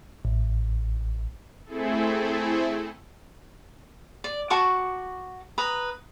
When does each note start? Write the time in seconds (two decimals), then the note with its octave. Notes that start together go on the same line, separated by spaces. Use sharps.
0.25 A1
1.66 A3 C4 E4 G#4 A4
4.24 D5
4.50 F#4 A5 C#6 D6
5.58 B4 A#5 D#6